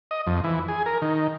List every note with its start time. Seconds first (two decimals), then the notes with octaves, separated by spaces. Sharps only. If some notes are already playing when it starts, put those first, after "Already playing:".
0.11 D#5
0.27 F2
0.44 E3
0.68 G#4
0.86 A#4
1.02 D#3